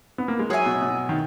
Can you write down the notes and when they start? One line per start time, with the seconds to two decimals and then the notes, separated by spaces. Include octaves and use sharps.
0.18 B3
0.28 A#3
0.39 G#3
0.50 F#3 G#4 C#5 E5 G#5
0.66 B2
0.82 B2
1.09 D#3